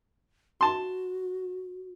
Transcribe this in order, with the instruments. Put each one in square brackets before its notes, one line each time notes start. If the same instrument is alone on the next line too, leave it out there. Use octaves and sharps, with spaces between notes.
[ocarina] F#4 [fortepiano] A5 C6